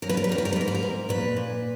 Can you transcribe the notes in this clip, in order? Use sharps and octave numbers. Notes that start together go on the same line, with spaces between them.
F#2 A#4
B4
A#4
B4
G3 A#4
B4
A#4
B4
G#2 A#4
B4
A#4
G#2
A#2 B4
A#2